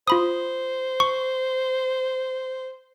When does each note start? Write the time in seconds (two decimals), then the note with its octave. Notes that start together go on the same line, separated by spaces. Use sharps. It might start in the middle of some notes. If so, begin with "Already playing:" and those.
0.08 F4 C5 B5 D#6
1.00 C#6